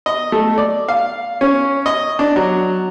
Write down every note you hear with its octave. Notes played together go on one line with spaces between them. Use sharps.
D#5
A3
D5
F5
C#4
D#5
D4
F#3